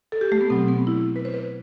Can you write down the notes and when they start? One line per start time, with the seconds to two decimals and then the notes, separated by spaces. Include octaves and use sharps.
0.12 A4
0.21 G4
0.32 A3
0.41 B3
0.50 B2 F#3 C4
0.68 B3
0.87 E4
1.16 B4
1.25 C5
1.34 B4